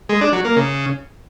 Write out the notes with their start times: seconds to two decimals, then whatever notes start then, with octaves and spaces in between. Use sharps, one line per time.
0.09 G#3
0.21 D4
0.33 F#3
0.45 A#3
0.56 C#3